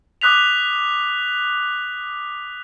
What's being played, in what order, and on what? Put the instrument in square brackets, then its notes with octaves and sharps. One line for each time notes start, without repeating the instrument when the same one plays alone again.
[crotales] D6 D#6 F#6 B6 F7